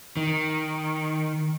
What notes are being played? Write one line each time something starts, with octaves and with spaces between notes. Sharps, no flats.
D#3